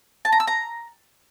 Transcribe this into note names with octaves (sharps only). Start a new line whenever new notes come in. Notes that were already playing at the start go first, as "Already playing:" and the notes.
A5
A#5
E6
A#5